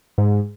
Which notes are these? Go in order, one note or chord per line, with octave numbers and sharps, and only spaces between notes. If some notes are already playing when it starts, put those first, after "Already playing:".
G#2